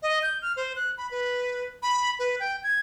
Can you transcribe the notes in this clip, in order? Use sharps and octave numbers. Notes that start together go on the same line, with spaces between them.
D#5
G6
F6
C5
F#6
B5
B4
B5
B4
G5
G#6